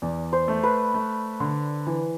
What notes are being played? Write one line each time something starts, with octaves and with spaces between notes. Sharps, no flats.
E2 D5
C5
A3
B4
A3
D3
E3